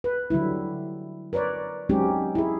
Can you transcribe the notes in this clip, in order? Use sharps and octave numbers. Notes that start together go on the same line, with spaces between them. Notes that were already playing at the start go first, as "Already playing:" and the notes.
B4
D3 F#3 G3 E4
A#4 B4 C#5 D5
F#3 G#3 C4 C#4 D#4 G4
E4 G#4